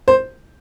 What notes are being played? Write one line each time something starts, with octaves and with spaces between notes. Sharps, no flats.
C5